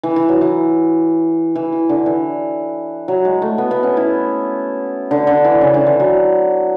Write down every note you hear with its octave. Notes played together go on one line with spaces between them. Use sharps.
E3
E3
F#3
E3
E3
E3
D3
E3
F#3
G#3
A3
B3
B3
C#4
E4
D3
D3
E3
C#3
D3
E3
F#3